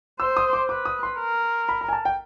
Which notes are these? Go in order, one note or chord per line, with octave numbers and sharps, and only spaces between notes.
C5 E6
D#6
D6
B4 D6
D#6
C6
A#4
B5
A#5
G#5
A5
G5